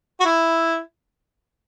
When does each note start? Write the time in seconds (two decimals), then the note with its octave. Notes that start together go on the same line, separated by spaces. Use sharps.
0.20 F#4
0.25 E4